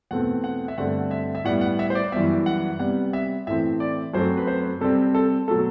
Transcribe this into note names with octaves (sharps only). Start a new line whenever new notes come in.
E2 B2 A3 C4 F#5
F#5
E5
G2 D3 A3 C4 F#5
E5
E5
A2 G3 B3 F#5
F#5
E5
C5
D5
F#2 E3 G3 B3 E5
F#5
C3 G3 B3 F#5
E5
A2 E3 A3 C4 E5
D5
F#2 F#3 A3 C4 C5
B4
C5
C3 G3 C4 A4
A4
B2 F#3 A3 A4